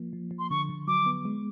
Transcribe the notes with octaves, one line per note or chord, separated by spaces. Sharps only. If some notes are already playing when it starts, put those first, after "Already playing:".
Already playing: F3 A#3
F3
F3
C6
D3 C#6
D3
F#3 D6
B3
G#3